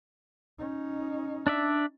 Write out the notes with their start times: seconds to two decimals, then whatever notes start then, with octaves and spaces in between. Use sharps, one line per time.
0.58 C#4 D#4
1.47 D4 D5 E5